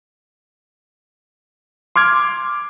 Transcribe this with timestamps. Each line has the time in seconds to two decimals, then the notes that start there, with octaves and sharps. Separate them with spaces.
1.96 C6 D6 F6 G#6